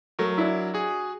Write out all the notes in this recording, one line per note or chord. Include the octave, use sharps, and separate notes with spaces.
F#3 A3 A#4
D4 E4
F#4 G#4